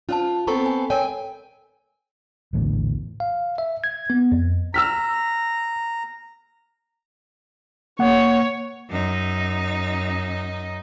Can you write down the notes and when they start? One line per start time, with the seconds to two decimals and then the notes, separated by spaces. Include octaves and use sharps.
0.09 C#4 F4 C5 A5
0.47 B3 C4 A4 A#5 C#6
0.66 G#5
0.90 A#4 C#5 G5 G#5
2.53 A#1 E2 A2 D3
3.20 F5
3.58 E5
3.84 G#6
4.10 B3
4.32 F2
4.74 A#5 E6 F6 B6
7.99 A#3 C#5 F#5
8.90 F#2 D#4